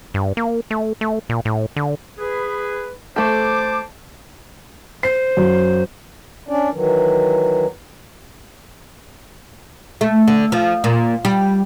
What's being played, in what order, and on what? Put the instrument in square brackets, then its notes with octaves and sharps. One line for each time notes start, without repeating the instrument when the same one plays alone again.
[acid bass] G2
A#3
A3
A3
A#2
A2
D3
[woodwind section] G#4 B4
[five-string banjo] A3 A4 [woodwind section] C5 A5 D6
[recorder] C5 [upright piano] C7
[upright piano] F#2
[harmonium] C#4 D4 D5
D#3 E3 F#3
[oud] A3
D3
F3
A#2
G3